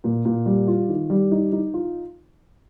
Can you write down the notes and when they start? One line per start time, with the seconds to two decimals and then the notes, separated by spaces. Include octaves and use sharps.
0.04 A#2
0.25 A#2
0.46 G3
0.67 F4
0.89 D#3
1.10 G3
1.31 D#4
1.52 D#4
1.74 F4